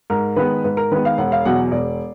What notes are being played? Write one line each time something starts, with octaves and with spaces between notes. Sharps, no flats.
G#2 A#4
D#3 G#3 B3 B4
G#2 B4
A#4
D#3 G#3 B3 B4
F5
E1 F#5
F5
E2 B2 F#3 F#5
E1 D5